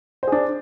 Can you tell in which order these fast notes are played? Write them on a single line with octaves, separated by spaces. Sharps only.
C5 G#4 D4